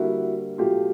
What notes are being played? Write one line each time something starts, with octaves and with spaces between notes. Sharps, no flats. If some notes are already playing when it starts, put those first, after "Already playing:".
Already playing: D3 G3 A#3 E4 F#4
B2 F#3 A3 F4 G4